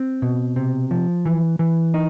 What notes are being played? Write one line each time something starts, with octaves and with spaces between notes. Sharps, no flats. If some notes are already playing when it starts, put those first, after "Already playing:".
Already playing: C4
B2
C3
F3
E3
E3
D#4